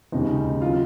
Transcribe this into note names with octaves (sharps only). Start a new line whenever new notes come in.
D#2 C#3 G#3 D#4
F#3 A#3 F4